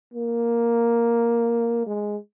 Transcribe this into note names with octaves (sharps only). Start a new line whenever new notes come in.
A#3
G#3